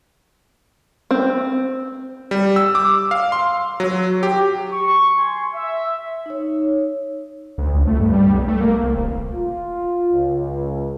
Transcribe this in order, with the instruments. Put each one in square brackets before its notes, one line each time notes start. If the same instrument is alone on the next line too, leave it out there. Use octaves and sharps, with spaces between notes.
[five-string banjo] C4
[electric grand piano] G3
E6
D6
F5
C6
F#3
G4
[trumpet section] C#6
G#5 C6
E5
[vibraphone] D#4 C#5
[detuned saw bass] D2
C#2
A3
G2
G3
B1
A3
A#3
C2
D#1
[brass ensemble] F4
C#2